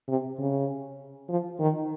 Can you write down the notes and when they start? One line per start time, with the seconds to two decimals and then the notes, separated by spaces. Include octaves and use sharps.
0.08 C3
0.38 C#3
1.29 F3
1.60 D#3